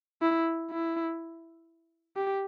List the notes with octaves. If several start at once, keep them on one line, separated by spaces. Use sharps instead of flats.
E4
E4
G4